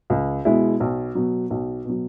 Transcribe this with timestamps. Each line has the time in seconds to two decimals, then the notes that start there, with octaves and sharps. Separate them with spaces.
0.10 C#2
0.45 B2 G#3 E4
0.80 B1
1.15 B2 F#3
1.50 B1
1.85 B2 F#3